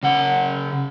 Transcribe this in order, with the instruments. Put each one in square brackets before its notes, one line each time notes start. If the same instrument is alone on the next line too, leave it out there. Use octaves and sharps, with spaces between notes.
[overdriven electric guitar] C#3 F#5